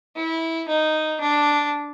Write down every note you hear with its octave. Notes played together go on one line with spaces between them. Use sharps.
E4
D#4
D4